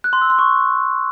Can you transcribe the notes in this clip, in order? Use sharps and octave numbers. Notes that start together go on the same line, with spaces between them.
F#6
C6
E6
C6
C#6